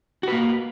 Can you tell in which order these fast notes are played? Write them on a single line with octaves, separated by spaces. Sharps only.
F#4 B4 A#3